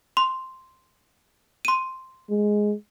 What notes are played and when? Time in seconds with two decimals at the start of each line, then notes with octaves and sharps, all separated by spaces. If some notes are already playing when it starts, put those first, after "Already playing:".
0.17 C6
1.65 C6 D#7
2.30 G#3